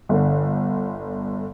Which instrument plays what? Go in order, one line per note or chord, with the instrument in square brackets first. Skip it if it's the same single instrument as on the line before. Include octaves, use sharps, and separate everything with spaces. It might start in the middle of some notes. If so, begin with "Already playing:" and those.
[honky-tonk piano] G1 D3